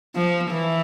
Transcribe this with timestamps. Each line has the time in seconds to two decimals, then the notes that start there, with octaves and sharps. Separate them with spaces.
0.15 F3
0.51 E3